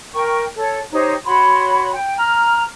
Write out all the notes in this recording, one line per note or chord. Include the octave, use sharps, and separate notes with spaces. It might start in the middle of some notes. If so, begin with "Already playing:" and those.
A#4 G5 C#6
A4 C#5
D#4 G4 C5 C#5
F#4 C#5 B5 C6
G5
A#5 F6